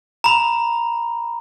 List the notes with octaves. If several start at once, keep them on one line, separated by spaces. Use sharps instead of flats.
A#5 B5